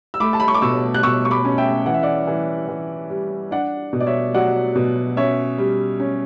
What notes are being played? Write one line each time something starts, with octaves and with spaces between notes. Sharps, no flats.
E6
A3 B5 D6
A5
B5
C#6
D6
B2 C#6 E6
F#6
B2 C#6 E6
C#6
B5 D6
C#4
E5 G5
E3 F#5
E5
D5 F#5
E3
E3
G3
D4 D5 F#5
B2
D5
C#5 E5
F#3 D5 F#5
B2
C#4 C#5 E5
G3
C#4